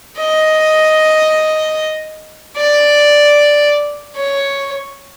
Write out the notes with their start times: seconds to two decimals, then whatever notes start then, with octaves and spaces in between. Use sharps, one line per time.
0.18 D#5
2.57 D5
4.16 C#5